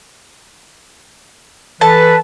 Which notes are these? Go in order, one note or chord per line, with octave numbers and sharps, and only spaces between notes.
E3 A4 B4 A5